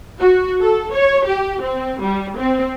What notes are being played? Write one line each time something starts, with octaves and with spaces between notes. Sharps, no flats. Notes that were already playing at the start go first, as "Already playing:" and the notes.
F#4
A4
C#5
G4
C4
G3
C4